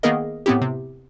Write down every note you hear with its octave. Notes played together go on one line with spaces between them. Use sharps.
D#3 A#3 B3 G#4 A#4 D#5
A2 B3 C4 E4 G4
C3